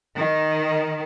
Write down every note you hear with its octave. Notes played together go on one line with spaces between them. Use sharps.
D#3